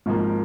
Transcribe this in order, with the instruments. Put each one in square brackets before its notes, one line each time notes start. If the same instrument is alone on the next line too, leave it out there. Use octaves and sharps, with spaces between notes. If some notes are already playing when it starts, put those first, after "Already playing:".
[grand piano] G#1 G#2 F3 A#3